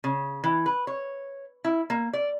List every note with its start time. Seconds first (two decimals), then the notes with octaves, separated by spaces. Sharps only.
0.04 C#3
0.44 E3
0.66 B4
0.87 C#5
1.65 E4
1.90 A#3
2.13 D5